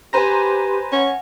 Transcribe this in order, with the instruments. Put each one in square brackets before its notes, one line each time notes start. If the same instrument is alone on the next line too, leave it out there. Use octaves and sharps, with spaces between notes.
[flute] G4 [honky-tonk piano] B4 C5 A#5 [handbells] G#5 A#6
[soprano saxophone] C#4 [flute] F#5